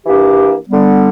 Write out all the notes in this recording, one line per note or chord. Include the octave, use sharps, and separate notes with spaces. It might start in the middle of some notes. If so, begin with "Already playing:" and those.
E3 A#3 D4 G4
D3 G3 B3